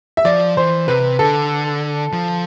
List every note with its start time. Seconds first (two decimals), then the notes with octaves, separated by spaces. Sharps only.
0.17 E5
0.25 F3 D5
0.57 E3 C5
0.88 C3 B4
1.19 D3 A4
2.13 F3